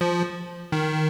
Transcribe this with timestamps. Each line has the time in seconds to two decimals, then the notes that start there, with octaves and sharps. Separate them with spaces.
0.01 F3
0.72 D#3